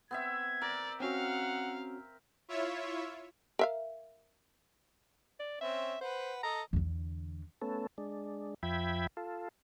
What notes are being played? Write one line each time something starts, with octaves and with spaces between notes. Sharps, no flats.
B3 C4 E5 G#6
A#4 D5
C4 C#4 F#4 F5 F#5
E4 F4 C#5 E5
A#4 E5 F5
D5
C4 C#4 E5
B4 C5 F#5
A4 D#5 A#5
E2 D3
A3 B3 C#4 A4
G#3 D4
F2 F3 E5 G5 B5 G#6
F4 A4